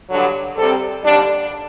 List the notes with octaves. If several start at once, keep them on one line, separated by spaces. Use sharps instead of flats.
G2 D3 F#3
C3 G3 C4 A4
D#2 D3 G3 D4